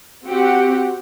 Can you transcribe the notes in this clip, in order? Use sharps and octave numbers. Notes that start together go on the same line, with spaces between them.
C4 F#4 G4 F#5